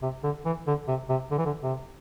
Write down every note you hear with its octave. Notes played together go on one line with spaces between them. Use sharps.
C3
D3
E3
D3
C3
C3
D3
E3
D3
C3